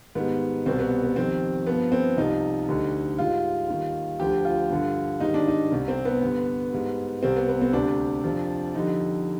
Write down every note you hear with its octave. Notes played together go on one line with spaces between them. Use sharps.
G#2 D#3 G3 B3
C2 B2 G3 C4
B3
B3
F2 D#3 G3 C4
F3 B3
G2
C4
C2 C3 F3 D#4
D2 D3 G3
G#2 G3 F4
D#2 D#3 G3
D2 D3 F3 G4
F4
G2 D3 G3
G#2 D#3 G3 D#4
D4
D#4
C2 C3 G3
C4
B3
G2 D3 G3
G#2 G3
C2 C3 G3 C4
B3
B3
C4
D2 C3 G3 D4
F2 C3 F3
F2 D3 G3 D#4